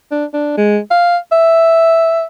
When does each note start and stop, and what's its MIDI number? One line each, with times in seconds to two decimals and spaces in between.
0.11 0.25 62
0.34 0.56 62
0.57 0.79 56
0.91 1.17 77
1.32 2.24 76